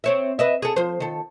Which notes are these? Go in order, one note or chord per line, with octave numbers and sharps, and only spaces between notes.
C4 C#5 E5
B4 D#5 E5
G#4 A4
F3 C5
D#3 A4